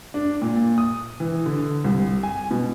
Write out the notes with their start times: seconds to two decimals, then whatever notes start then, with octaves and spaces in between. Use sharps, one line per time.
0.14 D4
0.42 A#2
0.78 D#6
1.20 E3
1.46 D3
1.84 C2
2.23 G#5
2.51 B2